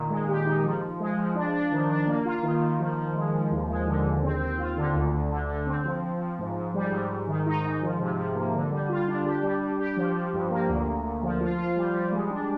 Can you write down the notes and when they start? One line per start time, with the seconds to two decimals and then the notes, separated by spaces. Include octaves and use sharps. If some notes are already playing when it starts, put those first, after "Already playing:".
Already playing: A#2 D#3
0.10 G#3
0.28 G4
0.46 D#4
0.64 F3
0.82 F3
1.00 G#3
1.18 F3
1.35 D4
1.54 D4
1.72 D#3
1.90 D4
2.07 A#3
2.25 F4
2.43 D#3
2.61 D#3
2.79 F3
2.96 F3
3.15 G#3
3.33 F3
3.51 D#2
3.69 G#3
3.87 D3
4.05 D#2
4.23 C4
4.40 C4
4.58 F4
4.77 D3
4.95 D2
5.13 D2
5.30 D3
5.49 D3
5.67 C4
5.85 F3
6.03 F3
6.20 F3
6.39 G#2
6.56 G#2
6.74 G3
6.92 G#2
7.09 G#2
7.27 D#3
7.46 D#4
7.63 G#2
7.82 F3
8.00 C3
8.17 F3
8.35 A#3
8.53 D3
8.71 G3
8.89 F4
9.07 D4
9.25 G4
9.43 G3
9.61 G3
9.79 G4
9.97 F3
10.15 F3
10.33 G2
10.50 A#3
10.68 D2
10.87 D2
11.04 D2
11.23 F3
11.41 F4
11.58 F4
11.76 G3
11.94 G3
12.12 G#3
12.30 D4